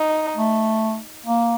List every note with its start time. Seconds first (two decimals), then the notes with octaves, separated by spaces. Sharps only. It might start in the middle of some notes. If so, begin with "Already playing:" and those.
Already playing: D#4
0.36 A3
1.26 A#3